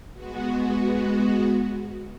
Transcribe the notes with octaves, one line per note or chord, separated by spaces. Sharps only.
G#3 B3 F#4